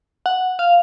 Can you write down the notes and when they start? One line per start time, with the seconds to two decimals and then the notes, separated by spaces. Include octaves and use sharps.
0.26 F#5
0.59 F5